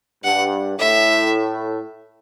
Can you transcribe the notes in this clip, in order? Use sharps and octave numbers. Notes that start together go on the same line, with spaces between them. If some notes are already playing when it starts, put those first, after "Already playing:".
G2 F#5
A2 E5